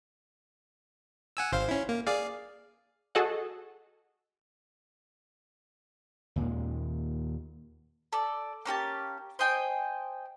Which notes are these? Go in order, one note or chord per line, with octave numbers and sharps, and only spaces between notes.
F#5 G#5 E6
G#1 C5 F5
C#4 E4
A#3
G#4 D5 F5
F#4 G#4 A4 D#5 F#5
D#2 A#2 D#3 G#3
A4 D5
A#3 C#4 G4 A5
C5 D#5 G5 G#5